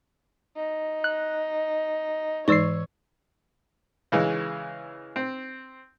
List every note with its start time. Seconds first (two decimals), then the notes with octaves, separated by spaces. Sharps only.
0.56 D#4
1.04 F#6
2.48 G#2 E3 C#5 D5 C#6 E6 C7
4.12 C#3 E3 G#3
5.16 C4